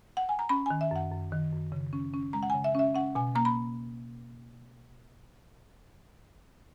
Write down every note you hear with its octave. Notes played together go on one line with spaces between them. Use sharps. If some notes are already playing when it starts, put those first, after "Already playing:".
F#5
G#5
A#5
C#4 B5
D#3 G#5
E5
F#2 F#5
F#2
D#3
F#2
C#3
C#4
C#4
G#3 A#5
F#5
C#3 G#5
E5
C#4 E5
C#4 F#5
B2 G#5
A#3 A#5
B5